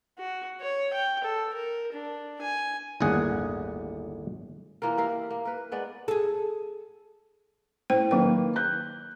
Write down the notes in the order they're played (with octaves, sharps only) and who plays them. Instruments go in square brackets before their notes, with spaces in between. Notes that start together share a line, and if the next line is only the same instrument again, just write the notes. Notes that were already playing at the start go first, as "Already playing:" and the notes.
[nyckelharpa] F#4
C#5
G5
A4
A#4
D4
G#5
[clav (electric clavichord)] G1 D#2 A2 D3 G#4 F#5
[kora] E3 A#3 F4 A#4
E4 G4 A#4 F5
A#3
A#4 B4
G#3 B3 D5
[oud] G#4 A4
[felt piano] A2 [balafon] C5 G5
[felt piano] D#3 A#3 B4 [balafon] F#3 G5
[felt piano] F#6 G6